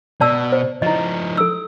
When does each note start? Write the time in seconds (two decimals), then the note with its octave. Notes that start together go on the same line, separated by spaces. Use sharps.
0.21 B2 D5 A5 E6
0.52 C5
0.82 F3 D#4 E4 D#5
1.37 A4 E6